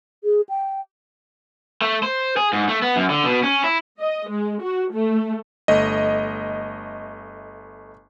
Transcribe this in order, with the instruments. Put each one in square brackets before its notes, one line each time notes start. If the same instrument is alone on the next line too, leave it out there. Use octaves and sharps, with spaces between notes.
[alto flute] G#4
G5
[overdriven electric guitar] A3
C5
G#4
G#2
A3
B3
F#2
D3
B2
C#4
E4
[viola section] D#5
G#3
F#4
A3
[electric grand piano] G1 A3 D#5